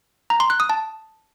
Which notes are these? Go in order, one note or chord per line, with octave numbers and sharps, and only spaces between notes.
A#5
C6
F#6
D#6
A5